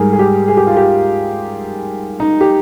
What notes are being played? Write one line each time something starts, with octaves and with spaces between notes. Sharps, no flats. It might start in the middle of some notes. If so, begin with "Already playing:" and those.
Already playing: G#2 G3 G#4 A#4
G#4
G4
G#4
G4
F4
G4
D#4
G4